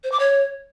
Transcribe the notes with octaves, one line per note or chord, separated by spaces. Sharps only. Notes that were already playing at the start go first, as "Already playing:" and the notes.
C5
D6
C#5